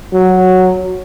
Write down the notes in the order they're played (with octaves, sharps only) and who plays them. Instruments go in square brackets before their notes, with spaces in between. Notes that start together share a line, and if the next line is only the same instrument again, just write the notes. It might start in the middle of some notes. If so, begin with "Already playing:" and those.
[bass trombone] F#3